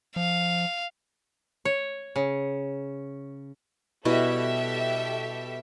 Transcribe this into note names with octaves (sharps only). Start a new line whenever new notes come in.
F3 F5
C#5
C#3
B2 G3 E4 G4 A4 E5